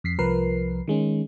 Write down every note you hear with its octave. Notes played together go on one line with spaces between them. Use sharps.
F2 B6 C7
C2 F3 A#4 B4 C7
D#3 G#3 C#4